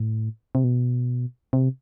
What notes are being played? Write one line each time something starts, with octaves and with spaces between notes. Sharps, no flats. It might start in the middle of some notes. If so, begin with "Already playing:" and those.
Already playing: A2
C3
B2
C3